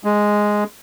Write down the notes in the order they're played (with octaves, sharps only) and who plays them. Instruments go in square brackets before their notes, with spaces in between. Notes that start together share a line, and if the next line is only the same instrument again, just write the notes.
[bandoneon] G#3